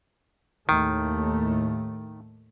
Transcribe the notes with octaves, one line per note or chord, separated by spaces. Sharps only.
D#2 A2 D#3 A3